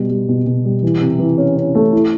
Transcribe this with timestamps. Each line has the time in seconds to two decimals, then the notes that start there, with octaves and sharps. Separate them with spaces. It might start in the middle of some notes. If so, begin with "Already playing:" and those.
Already playing: B2 G3
0.10 G3
0.28 B2
0.46 B2
0.65 G3
0.83 E3
1.01 C3
1.19 E3
1.38 C#4
1.57 C#4
1.75 A3
1.93 E4